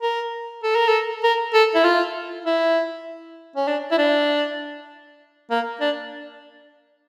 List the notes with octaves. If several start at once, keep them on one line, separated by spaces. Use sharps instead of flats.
A#4
A4
A#4
A4
A#4
A4
E4
F4
E4
C#4
D4
E4
D4
A#3
D4